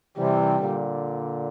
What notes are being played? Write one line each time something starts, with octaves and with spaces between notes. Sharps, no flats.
C3 E3 G3
A#2 D3